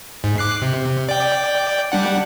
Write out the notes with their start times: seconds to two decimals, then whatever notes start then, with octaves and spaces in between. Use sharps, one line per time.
0.24 G#2
0.38 D6 F#6 C7
0.62 C3
1.09 D5 G5
1.92 G3 D4 F#5